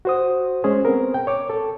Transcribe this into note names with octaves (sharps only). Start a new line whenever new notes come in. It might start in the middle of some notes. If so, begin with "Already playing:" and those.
F#4 C5 D#6
G#3 C#4 G#4 C5
B3 C4 A#4
G5
C#5 D6
A4